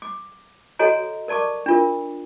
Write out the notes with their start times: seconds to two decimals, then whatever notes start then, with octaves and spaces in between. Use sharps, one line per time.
0.02 D6
0.79 F#4 A4 C#5 D#5 G#5 A#5
1.28 A#4 D5 A5 C#6 D6
1.66 D4 F4 A#4